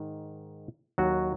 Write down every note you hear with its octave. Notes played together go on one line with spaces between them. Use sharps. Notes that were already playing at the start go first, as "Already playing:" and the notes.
Already playing: G#2 D#3
D#2 D#3 F#3 F#4